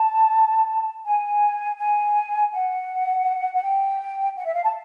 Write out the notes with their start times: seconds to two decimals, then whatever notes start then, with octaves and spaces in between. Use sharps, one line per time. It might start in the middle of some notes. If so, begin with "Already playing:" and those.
Already playing: A5
1.05 G#5
1.79 G#5
2.52 F#5
3.53 F#5
3.62 G5
4.37 F#5
4.45 E5
4.54 F5
4.63 A5